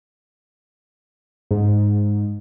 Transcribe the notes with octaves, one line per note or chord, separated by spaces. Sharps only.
G#2